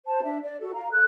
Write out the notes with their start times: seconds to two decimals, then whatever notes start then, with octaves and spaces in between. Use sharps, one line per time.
0.07 C5 A5
0.23 D4 E5
0.43 D5
0.60 F#4 A4
0.74 F5 A#5
0.92 A4 F#6